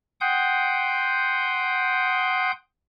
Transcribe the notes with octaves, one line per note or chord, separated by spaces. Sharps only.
F#5 G5 C6 D#6 G6